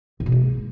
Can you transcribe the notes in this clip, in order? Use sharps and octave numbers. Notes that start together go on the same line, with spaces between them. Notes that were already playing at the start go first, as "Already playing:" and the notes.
F#2
B2
G#3